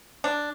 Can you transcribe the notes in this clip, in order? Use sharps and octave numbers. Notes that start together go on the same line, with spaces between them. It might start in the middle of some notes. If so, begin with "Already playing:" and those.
D4